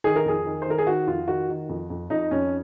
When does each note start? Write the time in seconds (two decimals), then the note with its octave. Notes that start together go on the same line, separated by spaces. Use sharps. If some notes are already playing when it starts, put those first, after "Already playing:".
0.04 D#3 G#4
0.16 A#4
0.25 F2 G#4
0.46 D#3
0.62 C5
0.66 D#3 A#4
0.78 G#4
0.87 D#3 F#4
1.07 F2 F4
1.27 D#3 F#4
1.49 D#3
1.69 F2
1.90 F2
2.10 F2 D#4
2.31 F2 C#4